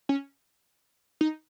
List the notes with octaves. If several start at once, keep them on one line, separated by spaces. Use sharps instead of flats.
C#4
D#4